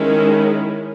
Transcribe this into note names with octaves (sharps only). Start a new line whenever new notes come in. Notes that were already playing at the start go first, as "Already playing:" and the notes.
Already playing: D#3 G#3 C#4 E4